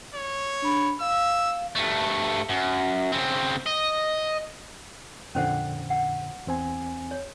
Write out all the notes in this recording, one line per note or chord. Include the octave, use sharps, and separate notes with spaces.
C#5
D4 B5
F5 E6
G2 A3
F#2
C#3 C4
D#5
F2 A#2 D3 C#4 C5 F#5
F#5
E2 C4 G#5
C#5